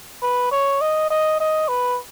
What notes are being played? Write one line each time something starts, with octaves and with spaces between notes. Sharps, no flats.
B4
C#5
D#5
D#5
D#5
B4